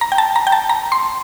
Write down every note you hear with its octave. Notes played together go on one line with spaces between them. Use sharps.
A#5
G5
A5
A#5
G5
A5
A#5
C6